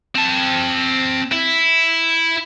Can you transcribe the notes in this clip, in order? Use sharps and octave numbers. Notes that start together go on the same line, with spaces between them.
C4 A5
E4